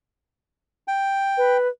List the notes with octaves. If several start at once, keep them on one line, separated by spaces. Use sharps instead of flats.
G5
B4